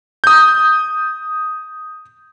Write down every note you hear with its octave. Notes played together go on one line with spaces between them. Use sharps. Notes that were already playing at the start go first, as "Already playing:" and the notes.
D#6 G6